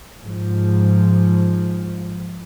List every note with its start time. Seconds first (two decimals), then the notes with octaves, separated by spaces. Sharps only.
0.21 G#2 F3